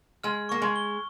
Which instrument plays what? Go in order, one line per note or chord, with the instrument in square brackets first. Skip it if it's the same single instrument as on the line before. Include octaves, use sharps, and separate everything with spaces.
[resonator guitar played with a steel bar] G#3 [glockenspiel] F6
[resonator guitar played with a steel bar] A#3 [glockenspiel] C#6
[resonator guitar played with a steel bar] G#3
[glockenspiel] G7